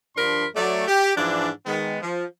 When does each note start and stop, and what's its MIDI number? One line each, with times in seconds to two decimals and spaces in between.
0.16 0.45 43
0.16 0.45 53
0.16 0.45 62
0.16 0.45 70
0.16 0.45 83
0.16 0.45 84
0.55 0.84 54
0.55 0.84 57
0.55 0.84 74
0.87 1.12 67
1.16 1.49 44
1.16 1.49 52
1.16 1.49 53
1.16 1.49 62
1.66 1.97 51
1.66 1.97 56
1.66 1.97 59
2.01 2.24 53